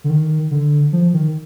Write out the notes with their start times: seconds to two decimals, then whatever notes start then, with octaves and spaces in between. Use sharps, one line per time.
0.04 D3
0.10 D#3
0.51 D3
0.93 F3
1.13 D#3